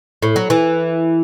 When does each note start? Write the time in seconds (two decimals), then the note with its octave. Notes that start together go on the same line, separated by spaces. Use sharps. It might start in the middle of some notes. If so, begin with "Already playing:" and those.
0.23 A2
0.36 F#3
0.50 E3